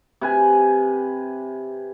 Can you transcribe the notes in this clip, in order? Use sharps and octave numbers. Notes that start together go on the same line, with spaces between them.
C3 B4 G#5